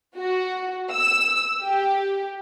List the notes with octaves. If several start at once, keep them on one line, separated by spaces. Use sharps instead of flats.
F#4
E6
G4